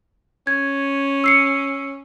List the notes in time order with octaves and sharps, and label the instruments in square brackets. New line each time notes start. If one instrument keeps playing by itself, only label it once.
[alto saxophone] C#4 [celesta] G#6
[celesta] E6 C7 C#7